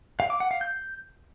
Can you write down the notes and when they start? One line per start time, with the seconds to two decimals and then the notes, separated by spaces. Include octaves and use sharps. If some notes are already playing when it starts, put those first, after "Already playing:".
0.20 F5
0.30 D6
0.40 F#5
0.51 F5
0.61 G6